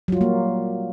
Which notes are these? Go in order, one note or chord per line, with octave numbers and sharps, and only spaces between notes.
F#3 G3 A#3 F4